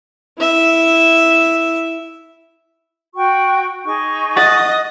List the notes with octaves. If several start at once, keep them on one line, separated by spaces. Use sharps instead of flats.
E4 E5
F#4 G5 C#6
D#4 G#4 C#6
D#5 F#5 F#6 A6